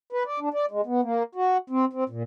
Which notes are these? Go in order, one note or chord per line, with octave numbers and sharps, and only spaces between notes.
B4
D5
D4
D5
G#3
B3
A#3
F#4
C4
C4
A#2